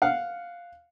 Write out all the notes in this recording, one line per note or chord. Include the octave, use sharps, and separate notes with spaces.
F5 F#5